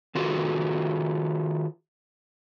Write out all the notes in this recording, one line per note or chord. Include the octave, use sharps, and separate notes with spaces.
D#3 F4 F#4 G#4 A4 B4